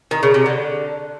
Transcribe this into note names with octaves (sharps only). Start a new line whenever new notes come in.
D#3
C#3
C3
D3